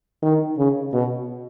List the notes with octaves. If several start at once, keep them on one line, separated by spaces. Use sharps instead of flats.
D#3
C#3
B2